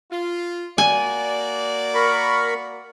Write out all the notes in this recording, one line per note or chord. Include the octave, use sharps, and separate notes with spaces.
F4
A#3 F#4 D5 G#5
A#4 B5 C#6